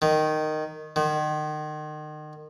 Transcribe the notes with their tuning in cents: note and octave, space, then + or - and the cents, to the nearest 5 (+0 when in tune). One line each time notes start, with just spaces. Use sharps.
D#3 -10
D#3 -35